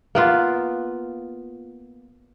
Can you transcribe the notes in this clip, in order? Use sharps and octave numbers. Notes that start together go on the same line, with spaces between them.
A#3 B3 F4